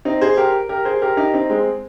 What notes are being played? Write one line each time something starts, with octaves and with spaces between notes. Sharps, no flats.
C4 D#4
G#4 C5
G4 A#4
G4 A#4
G#4 C5
G4 A#4
D#4 G4
C4 D#4
G#3 C4